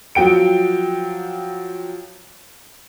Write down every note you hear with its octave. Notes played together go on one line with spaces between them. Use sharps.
F3 F#3 G5 D7